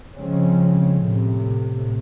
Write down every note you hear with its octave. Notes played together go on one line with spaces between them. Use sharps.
C#3 F3 G#3 C4 C#4
A2 C3